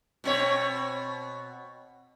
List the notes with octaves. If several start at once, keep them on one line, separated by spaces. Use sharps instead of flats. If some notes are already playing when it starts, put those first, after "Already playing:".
B2 C4 C#5